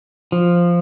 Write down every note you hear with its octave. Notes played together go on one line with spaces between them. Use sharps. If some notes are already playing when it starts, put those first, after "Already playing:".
F3